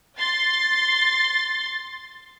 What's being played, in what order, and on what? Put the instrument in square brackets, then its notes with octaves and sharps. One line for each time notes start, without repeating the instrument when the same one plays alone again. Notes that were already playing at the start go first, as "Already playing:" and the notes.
[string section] C6 A6